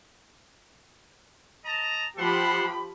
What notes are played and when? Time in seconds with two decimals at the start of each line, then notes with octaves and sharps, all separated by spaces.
1.65 D#5 A5 A#5
2.18 F3 G4 A4 F#5 B5 C6